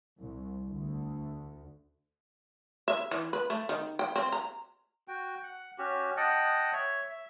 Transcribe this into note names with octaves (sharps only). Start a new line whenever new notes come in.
C2
D2
E5
E3
B4
A3
D#3
G5
C4
A#5
F#4 G5
F#5
C#4 F#4 G4
D#5 F#5 G5 A5
C#5 E5
E5